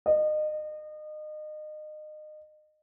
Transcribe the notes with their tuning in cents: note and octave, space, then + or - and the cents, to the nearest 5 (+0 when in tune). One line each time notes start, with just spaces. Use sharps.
D#5 -30